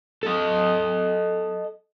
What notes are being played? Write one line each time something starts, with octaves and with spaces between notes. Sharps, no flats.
A4 D#5